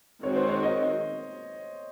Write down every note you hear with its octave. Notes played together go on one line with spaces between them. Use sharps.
D#3 G#3 C4 F#4 C#5
C5
C#5
D#5